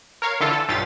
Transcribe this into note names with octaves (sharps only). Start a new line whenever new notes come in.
A#4 C#5 F5
D3 E3 E4 F4 A4
A4
B1 G2 F4 A6 B6